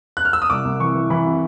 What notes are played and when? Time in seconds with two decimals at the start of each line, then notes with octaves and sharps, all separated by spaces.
0.17 F#6
0.25 F6
0.33 E6
0.42 D#6
0.50 C2 D6
0.65 C2
0.80 E3 C#6
0.95 E3
1.10 E3 B5
1.26 C3